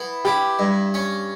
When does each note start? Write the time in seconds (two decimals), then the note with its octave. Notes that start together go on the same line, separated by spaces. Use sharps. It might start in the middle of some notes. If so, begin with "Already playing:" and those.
Already playing: E3 B3
0.25 E4 G4
0.59 G2
0.94 C#4